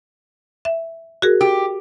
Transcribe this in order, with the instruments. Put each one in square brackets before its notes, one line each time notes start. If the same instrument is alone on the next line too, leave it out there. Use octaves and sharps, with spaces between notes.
[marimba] E5
F#4 G#4 A#4
[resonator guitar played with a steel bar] G4